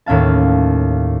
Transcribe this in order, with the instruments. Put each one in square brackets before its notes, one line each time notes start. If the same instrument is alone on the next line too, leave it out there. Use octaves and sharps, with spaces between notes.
[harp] D#2 A2 C#4 F5 A5